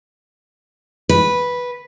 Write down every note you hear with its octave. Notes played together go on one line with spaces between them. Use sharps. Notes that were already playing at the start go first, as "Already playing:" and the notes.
B4